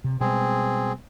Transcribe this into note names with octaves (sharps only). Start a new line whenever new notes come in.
C3
B2 G3 G#3 C4 G#4